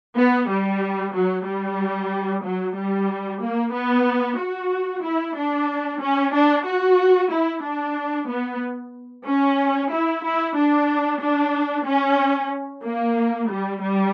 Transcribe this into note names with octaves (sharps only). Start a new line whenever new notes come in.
B3
G3
F#3
G3
F#3
G3
A#3
B3
F#4
E4
D4
C#4
D4
F#4
E4
D4
B3
C#4
E4
E4
D4
D4
C#4
A#3
G3
G3